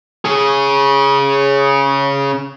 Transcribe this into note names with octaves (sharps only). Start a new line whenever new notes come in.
C#3 G#4